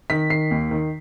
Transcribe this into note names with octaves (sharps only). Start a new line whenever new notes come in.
D#3 B6
D#3 C7
D#2
D#3